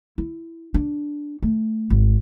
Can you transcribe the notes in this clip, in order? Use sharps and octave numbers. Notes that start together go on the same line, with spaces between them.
E4
D4
A3
G#1